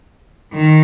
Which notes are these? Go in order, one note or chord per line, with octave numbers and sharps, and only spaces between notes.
D#3